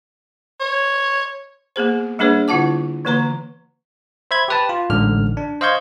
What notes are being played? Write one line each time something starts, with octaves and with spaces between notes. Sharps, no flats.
C#5
A#3 B3 G#4 C5
G3 A#3 D4 G#4 B4 C#5
D3 E4 F4 F#5 A5 D6
D3 E3 A#3 B4 A#5
C5 E5 B5 G#6
G4 B4 A5
F4
A1 G#2 D3 F6
D4
C5 D#5 F5 C#6 G6 G#6